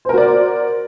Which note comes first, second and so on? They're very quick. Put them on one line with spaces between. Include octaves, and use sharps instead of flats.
C5 A#4 F#4 D5